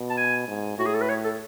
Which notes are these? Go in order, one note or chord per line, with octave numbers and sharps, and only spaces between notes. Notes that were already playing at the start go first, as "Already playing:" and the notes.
Already playing: B2
A5
G#5
G#2
A2 F#4
G#4
A4
B4
C#5
A4